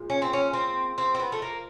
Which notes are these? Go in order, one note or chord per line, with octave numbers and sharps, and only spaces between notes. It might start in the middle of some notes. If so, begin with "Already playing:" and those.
Already playing: A#2 F3 G#3
C#4
C4
C#4
C4
C4
C4
B3
A3
A#3